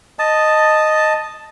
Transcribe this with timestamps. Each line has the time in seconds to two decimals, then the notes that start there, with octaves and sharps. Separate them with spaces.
0.19 D#5 A5